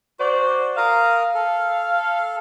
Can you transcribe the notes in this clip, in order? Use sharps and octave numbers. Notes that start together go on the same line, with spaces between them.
F#4 C5 D5
A#4 F5 A#5 D#6
A4